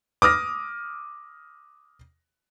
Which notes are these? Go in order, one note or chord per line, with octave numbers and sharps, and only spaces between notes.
D6 D#6 F6 A#6